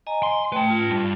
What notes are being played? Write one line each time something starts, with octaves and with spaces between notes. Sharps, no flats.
D#5 G#5 A#5
C6
A3 B4 G5 A5
F4
G2